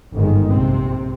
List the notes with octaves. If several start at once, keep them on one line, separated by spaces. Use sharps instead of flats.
G1 F2 G#2 D#3 G#3
A#1 C3 C4